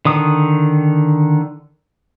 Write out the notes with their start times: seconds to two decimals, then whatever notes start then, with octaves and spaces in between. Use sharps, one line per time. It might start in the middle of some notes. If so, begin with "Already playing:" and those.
0.05 D3 D#3 D#6